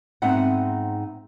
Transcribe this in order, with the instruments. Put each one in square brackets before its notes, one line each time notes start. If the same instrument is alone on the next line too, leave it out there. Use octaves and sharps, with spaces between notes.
[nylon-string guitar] G#2 B3 C4 D#4 E5 F#5